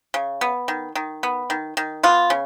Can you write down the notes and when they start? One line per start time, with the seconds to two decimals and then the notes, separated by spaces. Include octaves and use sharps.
0.14 C#3
0.41 B3
0.68 D#3
0.95 D#3
1.23 B3
1.50 D#3
1.77 D#3
2.03 B3 F4
2.30 C#3